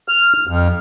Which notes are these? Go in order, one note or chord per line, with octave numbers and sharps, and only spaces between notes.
F6
F2